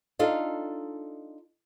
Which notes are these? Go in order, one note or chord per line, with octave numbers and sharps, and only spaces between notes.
D4 D#4 F4 A4